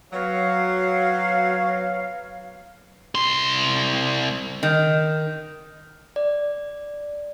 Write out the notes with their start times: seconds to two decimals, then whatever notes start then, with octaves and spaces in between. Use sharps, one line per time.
0.12 F#3 B3 C#5 F5
3.15 C2 C6
4.63 D#3
6.16 D5